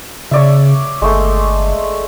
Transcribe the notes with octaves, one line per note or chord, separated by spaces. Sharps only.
C#3 C#5 D5 E5
G1 G#3 A3 C6